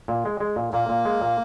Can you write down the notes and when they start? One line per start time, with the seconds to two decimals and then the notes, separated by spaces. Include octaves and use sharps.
0.08 A#2
0.25 G#3
0.40 G#3
0.56 A#2
0.73 A#2 A#3
0.89 A#2
1.05 G#3
1.21 A#2